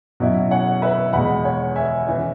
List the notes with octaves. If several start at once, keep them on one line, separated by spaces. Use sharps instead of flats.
B2 F#3 C#4 E4
C#5 F#5
B4 E5
E2 B2 G#3 F#5 B5
C#5 F#5
E5 G#5
E3 C#4